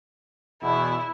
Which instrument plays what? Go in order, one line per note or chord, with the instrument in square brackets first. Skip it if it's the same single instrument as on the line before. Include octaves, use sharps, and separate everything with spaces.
[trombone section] E2 B2 [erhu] E4